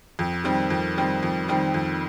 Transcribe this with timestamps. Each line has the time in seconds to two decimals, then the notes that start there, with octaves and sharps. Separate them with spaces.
0.19 F2
0.44 D#3 G3 C4
0.70 F2
0.96 D#3 G3 C4
1.23 F2
1.48 D#3 G3 C4
1.74 F2